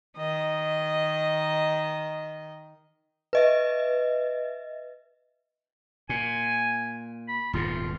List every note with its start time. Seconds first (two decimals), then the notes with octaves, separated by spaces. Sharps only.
0.17 D#3 D#5
3.33 B4 D#5 E5
6.09 A#2 G#5
7.28 B5
7.53 D#1 G#2 B2 F4